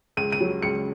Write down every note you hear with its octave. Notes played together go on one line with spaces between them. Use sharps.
C#2 D#7
D#7
F#3
C#2 C#7